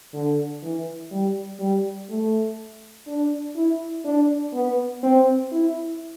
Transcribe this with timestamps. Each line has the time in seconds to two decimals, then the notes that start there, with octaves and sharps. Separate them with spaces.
0.13 D3
0.63 E3
1.11 G3
1.60 G3
2.09 A3
3.07 D4
3.56 E4
4.05 D4
4.53 B3
5.03 C4
5.52 E4